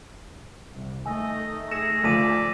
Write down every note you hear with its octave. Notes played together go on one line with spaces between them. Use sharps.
C2
D#3 A3 D#5 G#5 E6
G#4 E6 A#6 C#7 E7
D2 F3 D5 B6 D#7